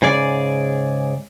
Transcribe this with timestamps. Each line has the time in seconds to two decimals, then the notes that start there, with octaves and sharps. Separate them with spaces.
0.02 G#2 C#3 G#4 D5